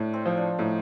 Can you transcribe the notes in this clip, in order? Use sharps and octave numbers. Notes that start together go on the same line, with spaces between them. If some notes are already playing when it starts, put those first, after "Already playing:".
Already playing: A2 D4
C4
F3
D4
A2 D#4